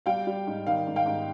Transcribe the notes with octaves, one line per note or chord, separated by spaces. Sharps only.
G3 F5 G5
G3
G#2
D#3 F5
G#2
F5 G5
G#2